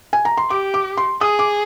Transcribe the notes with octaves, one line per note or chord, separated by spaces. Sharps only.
G#5
A#5
C6
G4 D6
D6
C6
G#4 D#6
D6